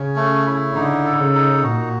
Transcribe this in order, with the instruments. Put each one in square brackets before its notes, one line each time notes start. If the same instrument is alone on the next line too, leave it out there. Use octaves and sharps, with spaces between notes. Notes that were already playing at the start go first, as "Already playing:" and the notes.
Already playing: [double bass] C#3 [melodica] C#4
[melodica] A3
E4
[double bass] D3 [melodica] D#4
[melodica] A4
[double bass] C#3
[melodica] D#4
[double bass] A#2 [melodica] F#4